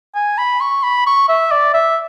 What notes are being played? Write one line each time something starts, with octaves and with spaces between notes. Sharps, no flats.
G#5
B5
C#6
B5
C#6
E5
D5
E5